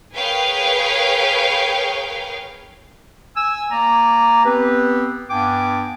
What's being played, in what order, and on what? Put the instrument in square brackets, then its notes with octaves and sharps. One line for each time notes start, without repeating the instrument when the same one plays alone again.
[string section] G#4 A#4 B4 C#5 F5 G5
[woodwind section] G#5 E6
A#3 D5 G#5 A#5
B3 C4 G4 B4
G2 B3 D4 G5 G#5 D6